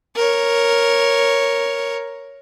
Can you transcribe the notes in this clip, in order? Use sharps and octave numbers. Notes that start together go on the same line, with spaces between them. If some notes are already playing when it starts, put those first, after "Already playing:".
A#4 C#5